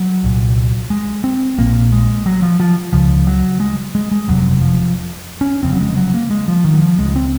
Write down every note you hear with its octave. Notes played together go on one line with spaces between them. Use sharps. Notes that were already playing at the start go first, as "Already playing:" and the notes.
Already playing: F#3
C2 A#2
G#3
C4
A#1 A#2 A#3
G#3
F#3
F3
F3
C#2 C#3 F3
F#3
G#3
G#3
G#3
F#1 F2 C3 F#3
F3
C#4
F1 F2 C#3 C4
F#3
G#3
F#3
A#3
G#3
F3
D#3
F#3
F3
C#2 C#3 G#3
C4